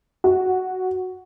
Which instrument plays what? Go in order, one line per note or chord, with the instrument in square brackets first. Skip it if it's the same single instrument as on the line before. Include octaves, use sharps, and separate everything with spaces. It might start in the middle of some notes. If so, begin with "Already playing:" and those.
[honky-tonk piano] F#4